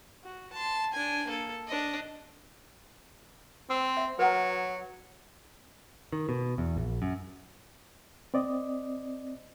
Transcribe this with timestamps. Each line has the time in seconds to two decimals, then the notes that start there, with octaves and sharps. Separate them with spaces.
0.24 F#4
0.53 A5 C6
0.94 D4 G#5
1.27 A#3 A4
1.67 D4 D#5
3.70 C4 E6
3.97 E5
4.19 F#3 B4 F#5 A#5
6.13 D#3
6.29 B2
6.58 E2
6.77 A#1
7.02 F#2
8.34 C4 D5 D#5